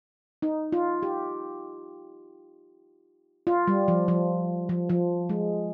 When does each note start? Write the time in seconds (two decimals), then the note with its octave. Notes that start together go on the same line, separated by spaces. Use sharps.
0.42 D#4
0.72 F4
1.03 G4
3.47 F4
3.67 G3
3.88 F3
4.08 F3
4.69 F3
4.89 F3
5.29 G#3